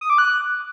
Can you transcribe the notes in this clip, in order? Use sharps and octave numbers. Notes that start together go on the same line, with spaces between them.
D#6
D6
F#6